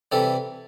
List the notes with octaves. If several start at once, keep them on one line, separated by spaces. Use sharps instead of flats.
C3 E3 G3 A4